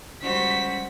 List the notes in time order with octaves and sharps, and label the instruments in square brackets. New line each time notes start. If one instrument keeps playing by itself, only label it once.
[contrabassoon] C#2 [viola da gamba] G3 F#4 [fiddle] C5 [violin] B6